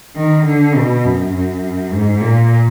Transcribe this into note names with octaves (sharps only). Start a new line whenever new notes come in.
D#3
D3
B2
F#2
F#2
G#2
A#2